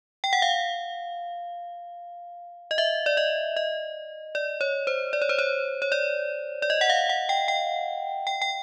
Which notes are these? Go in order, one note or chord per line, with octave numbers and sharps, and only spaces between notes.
G5
F#5
F5
D#5
E5
D5
D#5
D#5
D5
C#5
C5
D5
C#5
C5
C#5
C#5
D5
D5
D#5
F#5
F5
F#5
G5
G5
G5
G5